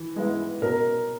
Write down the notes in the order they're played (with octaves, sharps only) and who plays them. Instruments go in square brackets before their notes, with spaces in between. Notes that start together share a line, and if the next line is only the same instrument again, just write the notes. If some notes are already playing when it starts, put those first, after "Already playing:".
Already playing: [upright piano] E3
G#3 B3 E4
[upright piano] B2 [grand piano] A#4